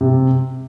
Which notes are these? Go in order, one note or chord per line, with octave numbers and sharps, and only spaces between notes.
C3